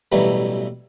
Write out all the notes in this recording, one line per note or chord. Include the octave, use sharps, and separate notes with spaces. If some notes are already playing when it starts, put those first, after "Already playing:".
A1 B2 E3 F#3 G3 A3